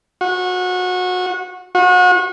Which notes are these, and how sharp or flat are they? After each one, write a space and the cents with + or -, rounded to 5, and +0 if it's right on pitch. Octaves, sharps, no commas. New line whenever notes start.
F#4 -25
F#4 -35